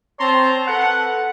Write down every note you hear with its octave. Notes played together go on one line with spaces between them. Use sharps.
C4 C#5 A5 A#5 C6
A4 B4 F#5